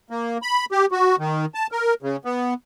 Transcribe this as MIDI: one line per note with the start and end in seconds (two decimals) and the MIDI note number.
0.10 0.38 58
0.42 0.65 83
0.72 0.86 67
0.92 1.16 66
1.19 1.45 51
1.55 1.67 81
1.72 1.94 70
2.03 2.16 49
2.25 2.54 59